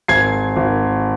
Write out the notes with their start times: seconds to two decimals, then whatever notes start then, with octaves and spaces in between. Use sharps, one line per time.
0.08 G#1 G#6 C7
0.56 G#1